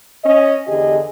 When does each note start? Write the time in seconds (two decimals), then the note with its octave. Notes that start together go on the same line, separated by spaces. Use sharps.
0.24 C#4 D#5
0.67 E2 D3 G4 G#4 D#5